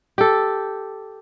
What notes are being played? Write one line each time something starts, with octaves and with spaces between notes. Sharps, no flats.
G4 A4